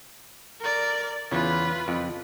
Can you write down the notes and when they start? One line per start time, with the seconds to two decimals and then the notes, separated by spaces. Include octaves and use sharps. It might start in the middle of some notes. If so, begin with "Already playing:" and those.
0.60 A#4 D5
1.32 E2 C#3 F4 B4
1.88 F2